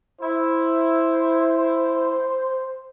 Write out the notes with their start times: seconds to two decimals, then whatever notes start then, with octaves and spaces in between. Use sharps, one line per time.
0.21 E4 C5